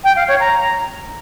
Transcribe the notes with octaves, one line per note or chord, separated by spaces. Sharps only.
G5
F5
C#5
A#5